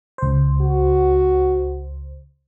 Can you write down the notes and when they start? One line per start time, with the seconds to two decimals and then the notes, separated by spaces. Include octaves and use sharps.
0.18 C#2 C5
0.61 F#4